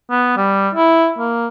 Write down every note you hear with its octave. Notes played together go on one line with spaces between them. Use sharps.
B3
G3
E4
A#3